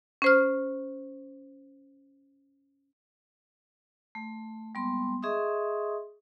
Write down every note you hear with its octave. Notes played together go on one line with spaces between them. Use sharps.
C#4 C5 F6
A3
G3 G#3 A#3 B3 C6
G#4 D#5 E5 C6 C#6 D#6